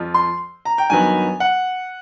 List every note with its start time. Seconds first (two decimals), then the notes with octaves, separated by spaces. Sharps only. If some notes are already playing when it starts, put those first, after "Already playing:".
Already playing: F2 F3
0.14 C6
0.65 A#5
0.78 G5
0.90 G2 D#3 F#3 B3 G#5
1.40 F#5